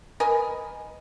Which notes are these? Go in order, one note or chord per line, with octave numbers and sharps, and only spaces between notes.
A#4 B4 D#5 G#5